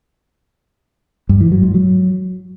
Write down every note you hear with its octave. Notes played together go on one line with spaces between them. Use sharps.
G2
E3
F#3
G#2
F#3